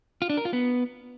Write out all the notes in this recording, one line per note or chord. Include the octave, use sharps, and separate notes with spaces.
F4
D4
A#4
F4
B3